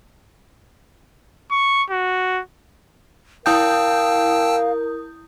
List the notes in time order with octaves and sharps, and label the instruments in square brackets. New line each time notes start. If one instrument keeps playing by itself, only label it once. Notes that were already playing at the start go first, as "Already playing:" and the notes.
[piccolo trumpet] C#6
F#4
[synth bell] E4 D#6 G6 [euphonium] A#4 [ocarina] F5 [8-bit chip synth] G5 A5 E6